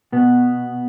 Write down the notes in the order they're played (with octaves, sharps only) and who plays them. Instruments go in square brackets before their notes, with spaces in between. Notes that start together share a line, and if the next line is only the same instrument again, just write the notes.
[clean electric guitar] B2 B3